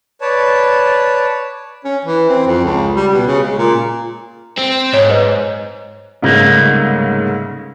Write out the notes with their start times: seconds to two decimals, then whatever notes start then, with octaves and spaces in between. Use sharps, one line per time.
0.21 B4 C#5 D5 A5
1.84 C#4
2.05 E3
2.29 C4
2.47 F2
2.65 C#2
2.96 G3
3.13 B2
3.27 C#3
3.43 G#3
3.58 A#2
4.57 C4
4.94 G#2 C#5
5.09 B4 C5 D#5
6.22 C2 G#2 C#3 A3 A#3